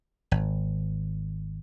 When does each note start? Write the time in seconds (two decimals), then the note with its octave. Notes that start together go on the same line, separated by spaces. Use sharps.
0.31 G#1